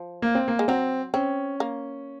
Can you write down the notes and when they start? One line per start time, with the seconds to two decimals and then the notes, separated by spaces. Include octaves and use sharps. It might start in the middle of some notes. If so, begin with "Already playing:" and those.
Already playing: F3
0.22 A#3
0.35 C4
0.48 A#3
0.59 G#3
0.68 F#3 C4
1.14 C4 C#4
1.60 A#3